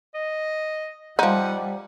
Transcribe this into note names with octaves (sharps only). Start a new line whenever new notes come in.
D#5
F3 G3 D#4 F#5